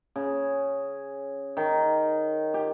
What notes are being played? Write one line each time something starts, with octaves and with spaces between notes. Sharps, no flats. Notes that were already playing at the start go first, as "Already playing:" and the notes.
C#3
D#3
G4